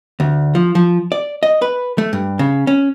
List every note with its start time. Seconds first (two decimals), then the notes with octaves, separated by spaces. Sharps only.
0.20 D2
0.55 F3
0.75 F3
1.12 D5
1.43 D#5
1.62 B4
1.98 A3
2.13 G2
2.39 C#3
2.67 C#4